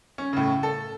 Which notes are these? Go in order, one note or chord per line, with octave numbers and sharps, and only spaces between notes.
C#4
A2 C#3
A4